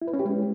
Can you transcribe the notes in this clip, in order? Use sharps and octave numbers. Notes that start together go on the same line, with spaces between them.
E4
B4
C#4
G4
G#3